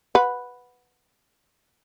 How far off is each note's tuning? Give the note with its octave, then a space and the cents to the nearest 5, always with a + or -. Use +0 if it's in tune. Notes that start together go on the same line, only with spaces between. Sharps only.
B4 +0 F#5 -10